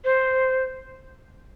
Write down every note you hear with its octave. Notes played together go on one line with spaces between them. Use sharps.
C5